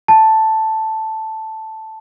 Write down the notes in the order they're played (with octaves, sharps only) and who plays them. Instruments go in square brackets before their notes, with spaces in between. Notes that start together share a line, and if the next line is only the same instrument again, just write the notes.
[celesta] A5